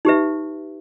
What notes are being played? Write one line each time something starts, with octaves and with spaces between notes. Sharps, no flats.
D#4 G4 B4 E5